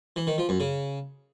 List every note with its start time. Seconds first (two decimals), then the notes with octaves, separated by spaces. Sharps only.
0.16 E3
0.27 D#3
0.38 F3
0.49 F#2
0.60 C#3